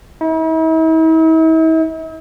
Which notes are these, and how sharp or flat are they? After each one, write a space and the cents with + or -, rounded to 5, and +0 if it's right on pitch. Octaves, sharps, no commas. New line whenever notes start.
E4 -45